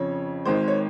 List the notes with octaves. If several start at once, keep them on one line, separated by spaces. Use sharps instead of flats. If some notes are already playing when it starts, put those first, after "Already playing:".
Already playing: F2 C#3 F3 C#5
G#1 G#2 D#3 G#3 C5
C#5